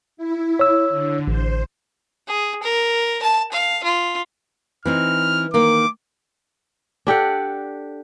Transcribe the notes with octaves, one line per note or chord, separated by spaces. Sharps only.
E4
C#5 E6
D3
A1 C5
G#4
A#4
A5
F5
F4
E3 C4 D#4 F6
D#3 A#3 D6
D4 G4 A4 F#5